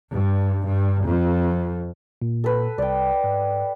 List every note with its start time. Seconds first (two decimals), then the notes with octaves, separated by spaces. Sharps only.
0.13 G2
0.67 G2
1.06 F2
2.22 A#2
2.44 A4 B4
2.78 C2 D5 G5
3.24 G#2